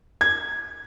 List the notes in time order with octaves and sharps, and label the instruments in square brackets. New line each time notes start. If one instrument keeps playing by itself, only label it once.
[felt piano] G#6